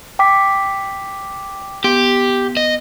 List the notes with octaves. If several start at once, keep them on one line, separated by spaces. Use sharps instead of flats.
G5 D6 B6
B3 G4
D#5